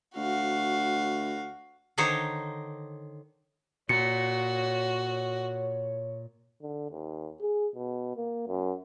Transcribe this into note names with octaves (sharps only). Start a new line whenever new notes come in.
D2 F#4 F5
D3 D#3 D#4 C5 C#5
A#2 F#4 C#5 C#7
D3
D#2
G#4
B2
A#3
F#2